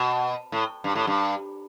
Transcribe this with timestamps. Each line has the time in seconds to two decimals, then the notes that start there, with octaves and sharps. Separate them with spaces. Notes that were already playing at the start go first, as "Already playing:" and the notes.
Already playing: B2
0.52 A2
0.84 G2
0.95 A2
1.07 G2